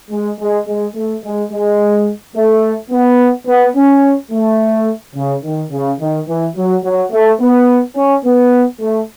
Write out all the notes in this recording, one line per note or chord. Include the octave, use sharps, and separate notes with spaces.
G#3
G#3
G#3
A3
G#3
G#3
A3
B3
B3
C#4
A3
C#3
D#3
C#3
D#3
E3
F#3
F#3
A3
B3
C#4
B3
A3